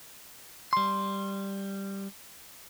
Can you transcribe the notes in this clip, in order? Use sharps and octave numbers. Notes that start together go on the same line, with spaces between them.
G3 C6